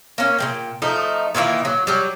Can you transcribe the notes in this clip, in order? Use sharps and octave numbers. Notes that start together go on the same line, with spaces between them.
A#3 C#4
A#2 G#3 G5
F3 A3 D#4
A#2 D#3 E3 A#3
F#3
F#3 G3